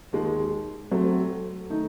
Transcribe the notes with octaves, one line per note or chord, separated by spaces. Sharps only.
D#2 D#3 G#3
F#3 A3 C4
D#3 A3 D#4